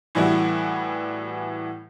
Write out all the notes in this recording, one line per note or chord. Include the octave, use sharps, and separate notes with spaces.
A2 E3 G3 B3 E4 F#4